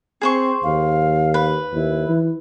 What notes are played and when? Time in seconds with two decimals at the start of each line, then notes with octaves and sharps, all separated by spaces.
0.21 C4 G#4 C5 C#6
0.63 D#2 F5
1.34 B4
1.73 D#2 E4
2.09 E3